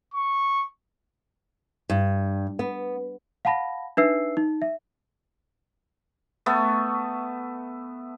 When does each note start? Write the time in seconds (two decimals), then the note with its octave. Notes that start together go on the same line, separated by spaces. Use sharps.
0.14 C#6
1.90 G2
2.59 B3
3.45 F5 F#5 A5 B5 A#6
3.97 D4 D#4 B4 E5 E6 C7
4.37 D#4
4.62 E5
6.46 A3 B3